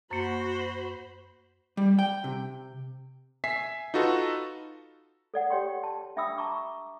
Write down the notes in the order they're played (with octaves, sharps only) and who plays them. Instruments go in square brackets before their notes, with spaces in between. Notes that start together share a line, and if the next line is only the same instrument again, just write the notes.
[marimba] F#2 A#3 [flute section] F#4 [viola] C5 B5
[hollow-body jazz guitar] G3
G5
C3
[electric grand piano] E5 G#5 B6 C7
D#4 F4 F#4 A4 B4
[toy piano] A4 D5 F#5
G4 C#5 G5 C6
A5
D4 E5 G5 B5 D#6 E6
A5 A#5 C#6 D6